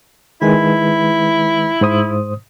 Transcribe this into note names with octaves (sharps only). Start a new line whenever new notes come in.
D#3 G#3 E4 B4
G#2 C5 D#6